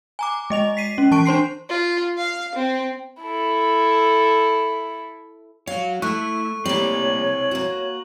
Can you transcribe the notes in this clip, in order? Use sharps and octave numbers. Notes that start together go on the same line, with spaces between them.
G#5 A#5 D6
G#3 D#5 F7
B6 C7 D#7
C#4
E3 A5 C#6 D7
D4 C5 C6 C7
F4
F5
C4
E4 A4
F#3 C#5 F5
A3 E4 C#6 F#6
G3 A#3 C4 E4 C#5 F#7
A#3 F#4